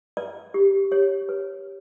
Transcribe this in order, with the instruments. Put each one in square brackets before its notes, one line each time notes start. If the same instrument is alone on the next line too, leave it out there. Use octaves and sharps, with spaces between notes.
[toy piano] B4 D5
G4
G4 C#5
B4